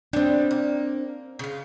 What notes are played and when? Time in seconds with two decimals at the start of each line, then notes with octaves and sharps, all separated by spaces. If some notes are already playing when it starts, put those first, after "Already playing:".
0.13 G3 B3 C4 D4
0.51 A#3
1.39 C#3 F4